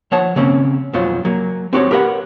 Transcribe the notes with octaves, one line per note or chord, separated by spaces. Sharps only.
F3 C#5 F#5 A5
C#3 A#3 C4 C#4
B1 F2 F#3 F4 C5
F#3 A#3
C4 F#4 G4 C#5
G4 A#4 B4 D#5 F#5